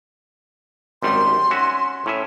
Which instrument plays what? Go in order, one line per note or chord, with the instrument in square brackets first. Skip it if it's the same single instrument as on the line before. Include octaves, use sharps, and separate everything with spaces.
[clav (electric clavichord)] G#1 F#2 G3 [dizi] C6
[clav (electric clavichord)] C#4 F#4 E5
A2 C#4 E5